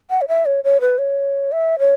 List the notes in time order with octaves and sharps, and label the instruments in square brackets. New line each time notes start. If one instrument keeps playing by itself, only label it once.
[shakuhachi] F#5
C#5
E5
C#5
C#5
B4
C#5
E5
C#5